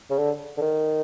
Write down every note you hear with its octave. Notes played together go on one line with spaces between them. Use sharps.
C#3
D3
D3
D#3